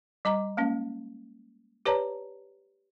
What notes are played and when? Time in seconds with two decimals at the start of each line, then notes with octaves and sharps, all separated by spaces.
0.25 G3 D#5 A#5 D6
0.57 G#3 A#3 C#4
1.85 G4 B4 C#5 D5 A5 A#5